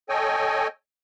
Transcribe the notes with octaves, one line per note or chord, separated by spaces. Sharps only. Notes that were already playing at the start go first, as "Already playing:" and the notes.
A4 C#5 D#5 G5 G#5